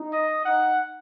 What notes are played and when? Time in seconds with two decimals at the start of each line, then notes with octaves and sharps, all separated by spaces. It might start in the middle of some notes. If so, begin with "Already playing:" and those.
Already playing: D#4
0.13 D#5
0.45 D#4 F#5